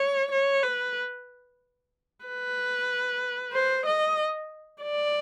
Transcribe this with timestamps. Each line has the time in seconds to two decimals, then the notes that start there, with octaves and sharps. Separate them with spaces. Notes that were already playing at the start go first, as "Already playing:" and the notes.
Already playing: C#5
0.32 C#5
0.63 B4
2.25 B4
3.53 C5
3.86 D#5
4.83 D5